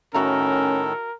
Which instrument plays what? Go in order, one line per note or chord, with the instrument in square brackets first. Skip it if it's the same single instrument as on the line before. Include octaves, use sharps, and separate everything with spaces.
[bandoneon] A2 D#3 A4 [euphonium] C#4 [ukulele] F#4 E5 A#5 [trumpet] A#4